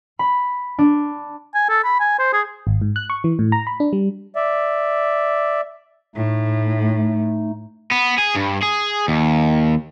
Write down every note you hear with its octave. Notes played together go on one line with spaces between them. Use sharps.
B5
D4
G#5
A4
B5
G#5
C5
G#4
G#1
G#2
F#6
C#6
E3
A2
A#5
B5
D4
G3
D5 E5
A2 A3 D#4
B3
G#4
G2
G#4
D#2